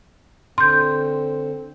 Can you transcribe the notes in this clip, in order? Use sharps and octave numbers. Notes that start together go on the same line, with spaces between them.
D3 C4 C6 G6